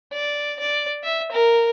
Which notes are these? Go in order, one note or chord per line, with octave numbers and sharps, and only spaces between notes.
D5
D5
E5
A#4